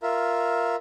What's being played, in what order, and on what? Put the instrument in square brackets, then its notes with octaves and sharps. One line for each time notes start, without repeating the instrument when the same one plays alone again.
[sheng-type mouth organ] F4 A#4 E5